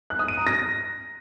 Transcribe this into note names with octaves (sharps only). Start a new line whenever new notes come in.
F#6
D#6
D#7
A#5
A#6